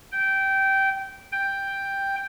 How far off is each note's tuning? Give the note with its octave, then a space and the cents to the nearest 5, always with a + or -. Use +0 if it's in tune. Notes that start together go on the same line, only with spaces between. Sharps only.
G5 -15
G5 +5